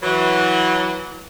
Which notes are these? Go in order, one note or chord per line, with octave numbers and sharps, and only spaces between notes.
E3 F#3